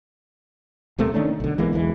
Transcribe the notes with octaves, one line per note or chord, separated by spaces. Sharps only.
D#1 C3 A3 A#3
D#3 A3 C#4 D4
B1 D3
E3 G#3 A#3 B3
E1 B1 E3 G#3